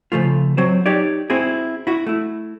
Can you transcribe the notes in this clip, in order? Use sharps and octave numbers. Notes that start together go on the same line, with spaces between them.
C#3 F3 A3 F4
F#3 C4 C5
D#4 G4 C#5 D5
C4 E4 F#4 G#4
E4 F#4
A3 E4